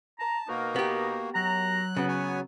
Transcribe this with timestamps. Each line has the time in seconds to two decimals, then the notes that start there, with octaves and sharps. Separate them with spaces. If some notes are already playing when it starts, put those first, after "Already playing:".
0.19 A5 A#5
0.49 B2 A#3 D#4 F#4 A#4
0.76 B3 G4
1.35 F#2 F#3 A#5 F#6
1.96 C#3 B3 F#4
2.08 C#5 G#5